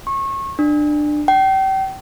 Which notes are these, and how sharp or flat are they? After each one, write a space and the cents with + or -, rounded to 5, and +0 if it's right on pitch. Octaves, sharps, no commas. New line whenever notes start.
C#6 -30
D4 +20
G5 -30